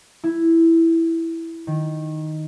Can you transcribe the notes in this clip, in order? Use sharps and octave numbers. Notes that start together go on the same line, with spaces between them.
E4
D#3